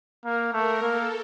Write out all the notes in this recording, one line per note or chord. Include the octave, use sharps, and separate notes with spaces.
A#3 A#4
A3 A#4
A#3 A4